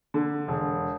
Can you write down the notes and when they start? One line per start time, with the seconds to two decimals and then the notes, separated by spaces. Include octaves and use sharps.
0.14 D3
0.48 E1